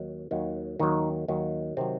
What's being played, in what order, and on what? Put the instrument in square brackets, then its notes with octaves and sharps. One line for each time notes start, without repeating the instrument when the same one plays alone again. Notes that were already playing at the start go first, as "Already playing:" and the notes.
Already playing: [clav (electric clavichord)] D#2 D#3 F#3
D#2 D#3 F#3
D#2 D#3 F#3 D#4
D#2 D#3 F#3
C3 D#3 F#3 C4